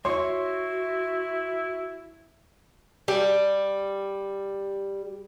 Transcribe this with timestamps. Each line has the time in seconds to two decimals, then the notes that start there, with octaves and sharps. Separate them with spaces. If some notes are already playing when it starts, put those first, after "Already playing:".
0.05 E4 F#4 C#5 C6 C#6
3.08 G3 G4